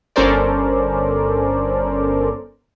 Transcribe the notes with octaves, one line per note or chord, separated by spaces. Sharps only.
G1 C#4 A4 A#4 C5 D5